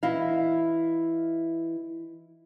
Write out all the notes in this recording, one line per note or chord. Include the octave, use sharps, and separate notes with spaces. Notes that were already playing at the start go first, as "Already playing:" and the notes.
E3 E4 D#5 F5